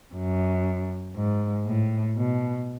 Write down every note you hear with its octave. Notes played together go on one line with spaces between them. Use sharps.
F#2
G#2
A2
B2